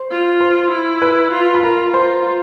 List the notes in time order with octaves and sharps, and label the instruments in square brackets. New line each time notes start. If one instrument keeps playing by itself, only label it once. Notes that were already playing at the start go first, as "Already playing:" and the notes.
Already playing: [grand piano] C5 C6
[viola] F4
[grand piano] C5 C6
[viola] E4
[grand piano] B4 B5
[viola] F4
[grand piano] B5
[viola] F4 [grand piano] A#4 A#5
[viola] F4 [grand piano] C5 C6